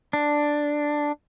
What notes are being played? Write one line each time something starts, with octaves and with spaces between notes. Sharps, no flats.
D4